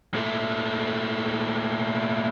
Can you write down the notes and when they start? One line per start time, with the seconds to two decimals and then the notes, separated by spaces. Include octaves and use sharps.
0.14 A#2 A3